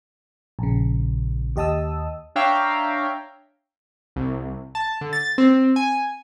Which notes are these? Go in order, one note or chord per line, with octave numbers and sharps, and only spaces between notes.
A#1 C#3
D#2 G4 D#5 A5 D#6 E6
D4 C#5 E5 F5 G5 A#5
C2
A5
D3
A6
C4
G#5